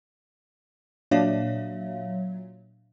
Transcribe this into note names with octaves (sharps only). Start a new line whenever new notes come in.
A#2 F#3 D4 C#5 E5 F5